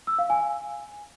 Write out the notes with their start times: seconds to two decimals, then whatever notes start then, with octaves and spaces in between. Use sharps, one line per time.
0.07 E6
0.19 F5
0.30 G#5